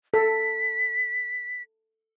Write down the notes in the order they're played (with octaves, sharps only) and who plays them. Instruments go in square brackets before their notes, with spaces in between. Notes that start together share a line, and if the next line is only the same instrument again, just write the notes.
[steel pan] A4 [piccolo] B6